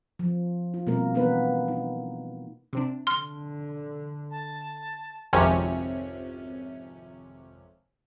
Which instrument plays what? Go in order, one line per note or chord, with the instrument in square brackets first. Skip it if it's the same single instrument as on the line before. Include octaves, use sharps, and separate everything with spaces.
[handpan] F3
F4
B2 G3 A#3 C4 A#4
E3 A#3 B3 D4 A#4 B4
D#4
[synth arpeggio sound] C3 C4 D4
[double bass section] D3 [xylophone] C6 F6
[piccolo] A5
[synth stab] G#1 F2 C3 C#4